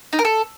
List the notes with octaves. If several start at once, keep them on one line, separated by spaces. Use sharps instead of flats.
D#4
A#4
A4